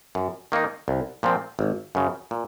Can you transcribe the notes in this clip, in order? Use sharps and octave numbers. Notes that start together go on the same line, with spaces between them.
F#2
D#3 A#3 D#4
C2
A#2 F3 C4
G#1
F#2 C#3
A#2